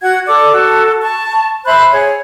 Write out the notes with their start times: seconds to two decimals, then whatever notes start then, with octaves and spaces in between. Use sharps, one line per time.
0.02 F#4 F#5 G#6
0.27 A4 D5 D6
0.53 F#4 A4
1.01 A5 C#6
1.65 C5 E5 B5 F#6
1.92 G#4 C#5